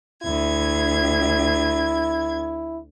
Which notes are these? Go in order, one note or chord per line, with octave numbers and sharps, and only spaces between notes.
D2 E4 G#6